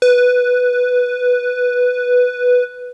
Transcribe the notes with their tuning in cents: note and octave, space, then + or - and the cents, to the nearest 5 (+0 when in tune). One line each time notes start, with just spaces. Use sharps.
B4 +0